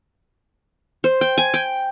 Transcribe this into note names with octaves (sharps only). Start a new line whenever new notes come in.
C5
G5
G#5
G5